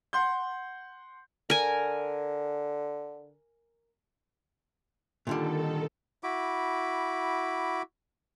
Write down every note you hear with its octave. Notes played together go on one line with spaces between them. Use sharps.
F#5 C6 G6
D3 A#4 G#5
A#2 D3 D#3 G3 A4
E4 F#4 B5 D6